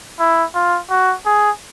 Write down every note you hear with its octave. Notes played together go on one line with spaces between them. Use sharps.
E4
F4
F#4
G#4